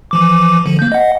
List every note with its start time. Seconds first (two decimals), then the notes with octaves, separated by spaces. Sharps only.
0.11 E3 F3 D6
0.66 D3 F3
0.79 A#3 G6
0.92 D#5 F#5